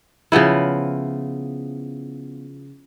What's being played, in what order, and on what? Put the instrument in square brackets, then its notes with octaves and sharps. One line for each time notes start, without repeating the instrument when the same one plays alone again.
[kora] C#3 F3 B3 E4